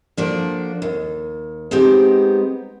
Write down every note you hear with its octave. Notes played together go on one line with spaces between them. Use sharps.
F3 A#3 D4 F#4 A4 D5
D#2
G#3 B3 C4 D#4 G4